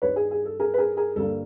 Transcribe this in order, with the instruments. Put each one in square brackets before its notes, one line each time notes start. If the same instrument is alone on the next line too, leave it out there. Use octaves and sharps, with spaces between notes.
[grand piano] G2 D#3 G3 B4 C#5
G#4
G#4
A4
G#4 A#4
B4
G#4 A#4
G#4 A#4
G2 D3 G3 A#3 A4